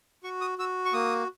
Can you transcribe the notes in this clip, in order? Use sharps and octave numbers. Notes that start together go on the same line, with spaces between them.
F#4 C#6
D#6
F#4 E6
C#6
A#3 D#6